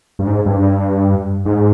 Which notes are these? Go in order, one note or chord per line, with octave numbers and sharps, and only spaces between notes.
G2
G#2
G2
G#2